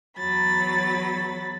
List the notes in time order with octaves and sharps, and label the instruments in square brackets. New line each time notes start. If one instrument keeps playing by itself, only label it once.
[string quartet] E2 F#3 B5 A6